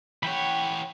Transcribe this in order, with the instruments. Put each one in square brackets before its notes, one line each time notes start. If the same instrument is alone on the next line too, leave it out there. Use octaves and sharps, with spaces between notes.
[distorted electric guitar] E3 C#5 [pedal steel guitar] F#5 G5 B5